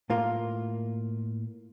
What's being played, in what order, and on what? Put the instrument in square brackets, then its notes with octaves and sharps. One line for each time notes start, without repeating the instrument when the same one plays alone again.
[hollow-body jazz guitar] A2 A#3 F4